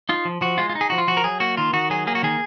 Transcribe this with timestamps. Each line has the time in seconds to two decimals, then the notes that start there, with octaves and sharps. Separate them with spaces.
0.09 D#4 F4
0.25 F3
0.41 F3 F#4
0.58 G#3 F4
0.70 F4
0.75 D#4
0.81 G#4
0.90 F3 F#4
0.98 F4
1.07 F3 F#4
1.17 A#4
1.24 F#3 G#4
1.40 A#3 F#4
1.57 D#3 F4
1.73 D#3 F#4
1.90 F#3 G#4
2.07 A#3 G#4
2.15 F#4
2.23 D#3 G#4